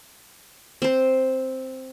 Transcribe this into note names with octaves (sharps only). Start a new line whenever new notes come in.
C4 C5